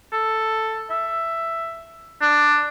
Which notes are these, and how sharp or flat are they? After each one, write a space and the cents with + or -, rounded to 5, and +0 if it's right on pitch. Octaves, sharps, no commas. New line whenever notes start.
A4 +5
E5 +10
D4 +10